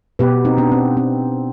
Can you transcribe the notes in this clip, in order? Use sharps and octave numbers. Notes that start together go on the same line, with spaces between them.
B2 B3 G4 B4
C4 D#4
B3 D4
C4
C4